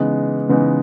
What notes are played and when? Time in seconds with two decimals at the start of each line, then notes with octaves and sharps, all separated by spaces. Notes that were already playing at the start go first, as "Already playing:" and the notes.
Already playing: C#3 E3 G#3 B3 D#4
0.49 C#3 E3 G#3 B3 D#4